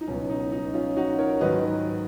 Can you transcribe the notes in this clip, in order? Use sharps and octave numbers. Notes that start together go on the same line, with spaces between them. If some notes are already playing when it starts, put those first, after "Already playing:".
D#4
C#2 B2 F#3 C#4
D#4
D#4
C#4 F4
D#4 F#4
A#4 C#5
G#2 D#3 F#3 B4 D#5